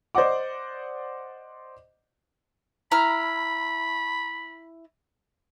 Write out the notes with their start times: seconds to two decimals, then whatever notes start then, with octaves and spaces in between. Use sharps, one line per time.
0.15 C5 D5 D#5 F#5 D6
2.92 E4 A#5 B5 F6